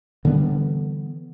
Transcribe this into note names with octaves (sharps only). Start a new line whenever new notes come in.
D3 E3 G3 B3